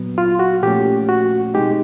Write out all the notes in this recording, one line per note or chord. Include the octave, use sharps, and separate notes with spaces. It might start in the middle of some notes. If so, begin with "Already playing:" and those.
Already playing: A#2 F#3 B3
F4
F#4
A#2 F3 A3 C#4 G4
F#4
B2 G#3 C4 D#4 G4